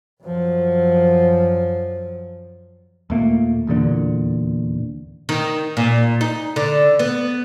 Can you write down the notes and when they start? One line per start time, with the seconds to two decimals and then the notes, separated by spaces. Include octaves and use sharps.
0.23 F#2 F3
3.10 D#2 A#2 A3 A#3
3.67 D#1 E2 A#2 D3
5.29 D#3
5.77 A#2
6.21 D#4
6.56 D3
6.99 B3